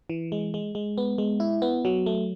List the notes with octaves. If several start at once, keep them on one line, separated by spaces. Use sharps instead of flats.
E3
G#3
G#3
G#3
B3
G#3
E4
B3
F#3
A3